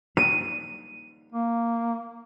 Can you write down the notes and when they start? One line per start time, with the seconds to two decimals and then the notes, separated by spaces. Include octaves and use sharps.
0.17 D#7
1.32 A#3